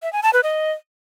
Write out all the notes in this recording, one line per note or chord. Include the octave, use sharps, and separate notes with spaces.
E5
G#5
A5
B4
D#5